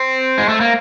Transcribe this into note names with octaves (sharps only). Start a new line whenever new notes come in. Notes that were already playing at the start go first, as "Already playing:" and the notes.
Already playing: C4
G#3
A3
A#3